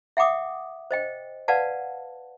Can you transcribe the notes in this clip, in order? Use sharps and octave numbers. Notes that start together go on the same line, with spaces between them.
E5 F#5 G5 D6 D#6
C5 D#5 G5
B4 D5 F5 F#5 A5